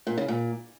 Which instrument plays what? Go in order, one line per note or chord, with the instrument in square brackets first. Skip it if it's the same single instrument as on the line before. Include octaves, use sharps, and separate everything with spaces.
[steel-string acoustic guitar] A#2
C#3
A#2